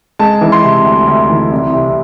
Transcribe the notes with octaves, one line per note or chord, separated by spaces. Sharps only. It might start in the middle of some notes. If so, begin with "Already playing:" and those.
G#3 A5
E3
C6
C3
D2
D2
E3
C2
C3